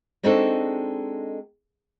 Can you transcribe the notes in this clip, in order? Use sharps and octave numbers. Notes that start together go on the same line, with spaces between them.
G#3 C4 D4 D#4 F#4 A4